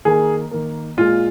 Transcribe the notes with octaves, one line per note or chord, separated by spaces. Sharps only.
D#3 A#3 G#4
D#3 A#3
A#2 G#3 F4